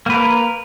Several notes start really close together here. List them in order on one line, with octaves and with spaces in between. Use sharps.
A#3 B4 A#4